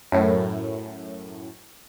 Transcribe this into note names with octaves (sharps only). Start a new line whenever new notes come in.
F#2 A2